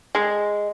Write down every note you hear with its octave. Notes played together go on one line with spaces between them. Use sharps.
G#3